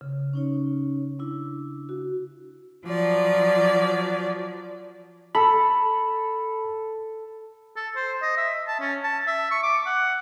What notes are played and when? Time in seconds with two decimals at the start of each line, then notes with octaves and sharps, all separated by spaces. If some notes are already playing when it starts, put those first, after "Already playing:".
0.01 C#3
0.33 C#4 D#4 C#5
1.19 D4 E4
1.89 F#4
2.86 F3 F#3 D5
5.35 A4 B5
7.76 A4
7.96 C5
8.22 D#5
8.37 E5
8.68 A5
8.80 C#4
9.03 A5
9.27 E5
9.51 C#6
9.63 D6
9.86 F#5